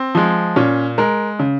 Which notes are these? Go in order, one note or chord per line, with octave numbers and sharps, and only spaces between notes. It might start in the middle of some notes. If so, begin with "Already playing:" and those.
Already playing: C4
F3 G#3
A#2 C#4
G#3 A#4
C#3